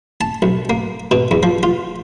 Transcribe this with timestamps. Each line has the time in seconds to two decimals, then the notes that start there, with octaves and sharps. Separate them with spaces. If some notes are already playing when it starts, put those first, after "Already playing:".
0.21 A5
0.42 B1
0.70 A#3
1.11 B2
1.31 E2
1.43 F3
1.63 F4